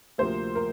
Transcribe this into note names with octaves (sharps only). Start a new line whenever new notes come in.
D2 C3 F3 A#3 C5
A#4